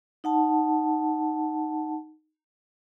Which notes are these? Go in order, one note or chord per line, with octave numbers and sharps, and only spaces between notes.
D#4 F#5 A5